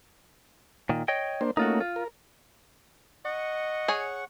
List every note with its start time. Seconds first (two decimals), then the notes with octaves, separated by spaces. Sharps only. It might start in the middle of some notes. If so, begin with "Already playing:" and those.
0.89 A#2 D#3
1.08 C#5 D#5 G5
1.41 A#3 D4 C5
1.57 A3 A#3 C#4 D#4 F4 F#4
1.80 F4
1.96 A#4
3.25 D#5 F#5 C#6
3.88 G#4 C#5 G#5